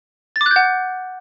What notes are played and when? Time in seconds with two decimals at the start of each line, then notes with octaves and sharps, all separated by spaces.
0.36 A6
0.41 D6
0.46 F#6
0.51 G6
0.56 F#5